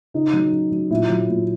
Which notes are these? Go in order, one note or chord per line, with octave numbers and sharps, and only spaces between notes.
C#3 D#4
F#3
C#3
F#3
A#2 E4
F#3
A#2